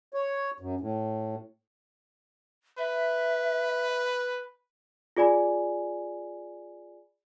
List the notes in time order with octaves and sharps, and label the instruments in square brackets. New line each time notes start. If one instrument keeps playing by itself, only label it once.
[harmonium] C#5
F#2
A2
[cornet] B4 [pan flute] E5
[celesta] F4 G#4 D5 G#5 B5